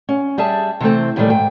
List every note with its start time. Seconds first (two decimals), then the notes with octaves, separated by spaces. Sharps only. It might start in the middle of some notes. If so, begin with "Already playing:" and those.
0.09 C#4
0.38 G3 G#4 E5 A5
0.80 C3 E3 A3 C4
1.16 A2 D#3 E3 F#3 G3 A3
1.30 G#2 G5